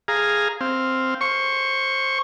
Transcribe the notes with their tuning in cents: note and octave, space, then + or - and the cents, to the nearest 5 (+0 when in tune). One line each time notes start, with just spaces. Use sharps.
G#4 +0 F5 -5 A#5 +0
C4 +0 F5 +0
C5 +20 C#6 +0